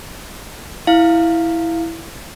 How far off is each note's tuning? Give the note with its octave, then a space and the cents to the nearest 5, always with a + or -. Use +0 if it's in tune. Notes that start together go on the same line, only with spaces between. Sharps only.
E4 +0 F5 +0